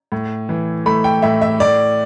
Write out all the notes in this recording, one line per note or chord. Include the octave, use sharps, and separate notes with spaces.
A2
E3
A3 B5
G5
A2 E5
E5
A2 D5